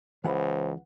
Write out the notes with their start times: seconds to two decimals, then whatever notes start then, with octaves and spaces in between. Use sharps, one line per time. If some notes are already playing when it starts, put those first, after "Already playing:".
0.24 C#2 E3 C5 F#5 B5